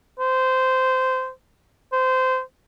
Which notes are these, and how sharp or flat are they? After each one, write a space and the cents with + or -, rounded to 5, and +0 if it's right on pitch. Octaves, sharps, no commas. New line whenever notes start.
C5 -15
C5 -20